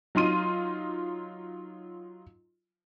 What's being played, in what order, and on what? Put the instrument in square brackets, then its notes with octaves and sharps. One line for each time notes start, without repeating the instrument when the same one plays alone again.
[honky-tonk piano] F#3 D#4 F4 C6 D#7